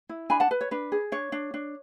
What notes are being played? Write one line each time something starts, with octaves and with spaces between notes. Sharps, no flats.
E4
D4 G#5 B5
F#5 A5
B4
C#5
D4 B4
G#4
D4 C#5
D4
D4